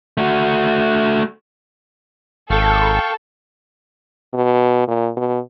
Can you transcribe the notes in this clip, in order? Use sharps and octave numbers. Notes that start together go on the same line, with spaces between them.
A3 F#4
G#1 A4 F5 G5 C#6
B2
A#2
B2